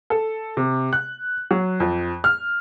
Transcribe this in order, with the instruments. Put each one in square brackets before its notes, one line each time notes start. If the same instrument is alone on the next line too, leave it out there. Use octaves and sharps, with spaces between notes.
[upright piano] A4
C3
F#6
F#3
F2
F6